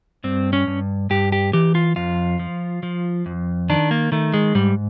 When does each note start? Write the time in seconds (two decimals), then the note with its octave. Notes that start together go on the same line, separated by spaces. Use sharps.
0.24 G2 C4
0.53 C#4
0.67 G2
1.10 G2 G4
1.32 G4
1.53 E3 G4
1.75 F4
1.96 F2 F4
2.39 F3
2.83 F3
3.26 F2
3.70 D#3 D4
3.91 A#3
4.12 D#3 A3
4.34 G#3
4.55 G#2 G3